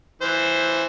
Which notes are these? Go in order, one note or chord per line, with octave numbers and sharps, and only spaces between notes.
E3 C5